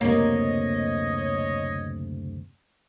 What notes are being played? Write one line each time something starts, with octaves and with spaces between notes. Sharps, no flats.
F#1 D2 C3 A#3 C#5 D#5